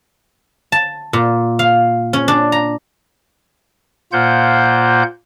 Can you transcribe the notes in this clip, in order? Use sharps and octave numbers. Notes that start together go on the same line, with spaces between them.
A5
A#2
F5
C#4
D4
A#5
A#2 A#3 F4 C5 F#5 G6